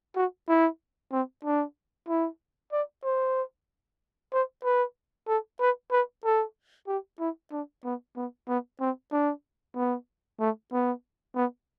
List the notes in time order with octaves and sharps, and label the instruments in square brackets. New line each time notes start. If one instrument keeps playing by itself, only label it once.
[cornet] F#4
E4
C4
D4
E4
D5
C5
C5
B4
A4
B4
B4
A4
G4
E4
D4
B3
B3
B3
C4
D4
B3
A3
B3
B3